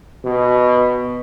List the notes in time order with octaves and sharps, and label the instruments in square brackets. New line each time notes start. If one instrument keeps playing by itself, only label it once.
[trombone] B2